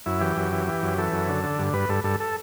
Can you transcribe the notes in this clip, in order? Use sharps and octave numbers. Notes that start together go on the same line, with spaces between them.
F#2 E4
E3 G4
F#2
E3
E3
F#2
E3 A4
F#2
D3
D3
G2
G2 B4
G2 A4
G2 A4
A4